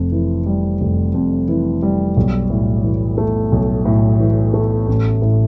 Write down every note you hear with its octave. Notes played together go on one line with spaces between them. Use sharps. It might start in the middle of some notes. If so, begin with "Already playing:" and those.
Already playing: F1 F2
E3
G3
F1
F2
E3
G3
B1
A2
E3
A3
B1
A2
E3
A3
A1
A2